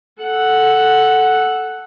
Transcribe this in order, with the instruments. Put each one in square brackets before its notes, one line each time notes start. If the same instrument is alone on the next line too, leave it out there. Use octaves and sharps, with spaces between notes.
[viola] A4 F#5